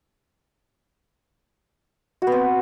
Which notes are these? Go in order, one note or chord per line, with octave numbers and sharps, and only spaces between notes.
F#4
B3
C4